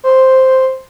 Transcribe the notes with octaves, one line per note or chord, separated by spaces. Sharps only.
C5